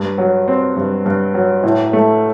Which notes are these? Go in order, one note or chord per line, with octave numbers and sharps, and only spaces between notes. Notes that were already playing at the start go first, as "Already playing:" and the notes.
Already playing: G2
F#3
C4
G2
G2
F#3
A2
A3